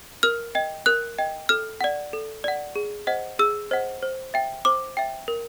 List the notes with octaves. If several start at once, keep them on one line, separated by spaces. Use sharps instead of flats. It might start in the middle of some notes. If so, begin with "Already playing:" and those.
A#4 F6
D#5 G5
A#4 F#6
D#5 G5
A4 F6
D5 F#5
A4
D5 F#5
G#4
C5 D#5 F#5
G#4 E6
C5 D#5 F#5
C5
E5 G5
C5 D6
E5 G5
A#4